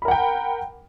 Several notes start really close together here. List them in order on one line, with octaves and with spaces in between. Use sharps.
B5 A#4 F#5 G5